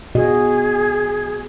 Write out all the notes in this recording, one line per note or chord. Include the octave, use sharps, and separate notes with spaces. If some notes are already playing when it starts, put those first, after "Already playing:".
B2 F#4 G#4 D#5